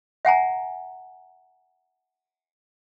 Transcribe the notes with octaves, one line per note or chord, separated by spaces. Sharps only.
E5 F#5 G#5 A#5